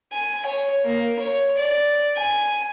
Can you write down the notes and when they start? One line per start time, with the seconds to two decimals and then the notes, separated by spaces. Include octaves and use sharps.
0.12 G#5
0.46 C#5
0.84 A#3
1.19 C#5
1.57 D5
2.17 G#5